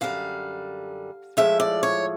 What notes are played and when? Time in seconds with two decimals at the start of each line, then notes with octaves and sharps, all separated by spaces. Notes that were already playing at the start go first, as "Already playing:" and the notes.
0.01 F#2 D3 G3 F5
1.37 A2 F3 G#3 E5
1.60 D5
1.83 C#5